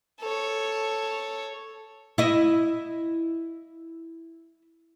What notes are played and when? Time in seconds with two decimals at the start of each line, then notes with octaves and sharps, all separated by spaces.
0.21 A4 C#5
2.18 E4 D#5